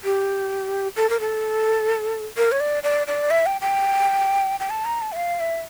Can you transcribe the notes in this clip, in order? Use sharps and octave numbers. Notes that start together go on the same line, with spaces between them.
G4
A4
A#4
A4
A#4
C#5
D5
D5
D5
E5
G5
G5
G5
A5
A#5
A5
E5
F5
E5